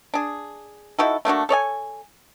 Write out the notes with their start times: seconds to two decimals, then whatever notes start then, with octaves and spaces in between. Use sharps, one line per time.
0.14 D4 G#4
0.99 D#4 E4 F#4 A4
1.25 A3 A#3 D4 F#4
1.49 A4 C#5 D5 G#5